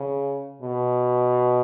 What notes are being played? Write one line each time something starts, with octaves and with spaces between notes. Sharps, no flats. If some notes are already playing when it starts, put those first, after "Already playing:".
Already playing: C#3
B2